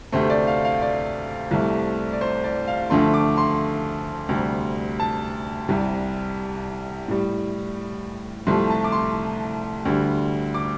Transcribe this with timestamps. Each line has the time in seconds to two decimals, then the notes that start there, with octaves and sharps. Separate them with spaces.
0.12 D2 C3 A3 C5
0.30 D5
0.47 F5
0.65 F5
0.82 D5
1.51 C2 C3 A3
2.13 D5
2.21 C5
2.44 D5
2.68 F5
2.90 D2 D3 F3 A3 C6
3.14 D6
3.37 C6
4.29 D2 C3 G3
5.00 A5
5.69 C2 C3 G3
7.08 A2 G3
8.47 C2 C3 F3 A3 C6
8.70 A5
8.84 D6
8.92 C6
9.85 D2 D3 G3
10.54 D6